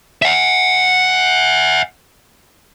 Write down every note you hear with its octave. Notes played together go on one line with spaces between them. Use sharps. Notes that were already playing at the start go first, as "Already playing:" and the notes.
E5 F#5